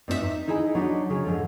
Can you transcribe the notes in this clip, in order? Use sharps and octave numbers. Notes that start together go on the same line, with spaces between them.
G2 C4 D#4 F4 E5
D#4
D#4 E4 G#4 D#5 G#5
F#3 D4 D#4 G4 D5
C#3 F#3 G#4
G#2 D3 F3